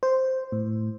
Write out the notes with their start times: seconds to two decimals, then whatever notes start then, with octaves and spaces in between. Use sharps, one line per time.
0.03 C5
0.52 A2